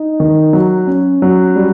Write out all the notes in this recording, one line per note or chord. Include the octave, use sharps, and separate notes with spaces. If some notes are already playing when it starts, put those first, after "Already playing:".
Already playing: D#4
D#3
F#3
C#4
F#3
G3